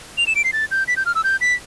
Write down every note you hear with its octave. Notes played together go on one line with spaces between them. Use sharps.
F7
E7
D7
C7
A6
G6
B6
G6
F6
E6
G6
B6